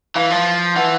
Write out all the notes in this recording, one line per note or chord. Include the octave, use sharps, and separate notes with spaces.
E3 F5
F3
E3 F#5